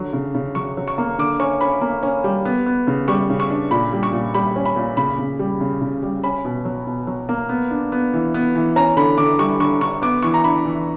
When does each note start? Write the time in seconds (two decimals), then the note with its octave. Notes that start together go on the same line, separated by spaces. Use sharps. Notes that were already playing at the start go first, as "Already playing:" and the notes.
Already playing: D3 F#3
0.13 C#3
0.35 C#3
0.55 F#3 C#6
0.77 F#3
0.88 C#6
0.98 A#3
1.18 D3 D6
1.40 C#4 C#6
1.61 C#4 B5
1.81 A#3
2.03 C#4
2.24 G3
2.45 B3
2.66 B3
2.87 C#3
3.08 G3 C#6
3.30 C#3
3.40 C#6
3.50 D4
3.71 A#2 B5
3.93 G3
4.03 C#6
4.13 A#2
4.34 G3 B5
4.56 C#4
4.65 B5
4.76 A#2
4.97 C#3 B5
5.18 C#3
5.39 G3
5.60 C#3
5.81 C#3
6.03 G3
6.24 C#4 B5
6.45 B2
6.65 F#3
6.87 B2
7.07 F#3
7.29 A#3
7.49 B3
7.71 D4
7.92 B3
8.13 E3
8.34 B3
8.55 E3
8.76 C#4 A#5
8.97 D3 B5
9.18 D3 D6
9.39 G3 C#6
9.60 D3 C#6
9.81 D3 C#6
10.02 B3 D6
10.23 E3 C#6
10.34 A#5
10.44 D4 B5
10.65 E3